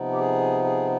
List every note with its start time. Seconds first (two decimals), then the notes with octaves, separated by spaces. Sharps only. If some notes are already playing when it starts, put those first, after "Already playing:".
Already playing: C3 F3 B3 D#4
0.12 G4
0.19 G#4
0.64 G#4